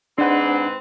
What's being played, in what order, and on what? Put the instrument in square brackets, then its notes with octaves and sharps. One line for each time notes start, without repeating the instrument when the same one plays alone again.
[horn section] G#2 C4 B4 [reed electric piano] D4 F#5